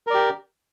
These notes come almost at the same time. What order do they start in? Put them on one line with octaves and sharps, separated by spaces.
A#4 D5 G4